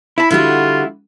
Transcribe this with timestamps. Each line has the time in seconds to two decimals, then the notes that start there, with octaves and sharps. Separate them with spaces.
0.18 E4 A5 B5
0.31 D3 G3 F4 F#4